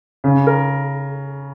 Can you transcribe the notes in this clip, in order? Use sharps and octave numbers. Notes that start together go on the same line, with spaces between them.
C#3
A#4